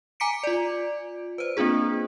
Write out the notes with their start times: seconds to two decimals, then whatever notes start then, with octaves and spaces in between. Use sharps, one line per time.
0.20 G#5 A#5 D6 B6 C#7 D7
0.43 F4 D5
1.38 B4 C5
1.57 A#3 C4 D4 F4 G#4